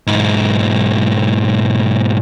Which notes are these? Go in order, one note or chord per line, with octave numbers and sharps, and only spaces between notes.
B1 G#2